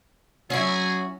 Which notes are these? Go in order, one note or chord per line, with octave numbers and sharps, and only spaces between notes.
F#3 C#4 E4 F#4 G#4